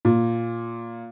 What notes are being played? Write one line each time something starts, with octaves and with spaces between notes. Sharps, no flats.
A#2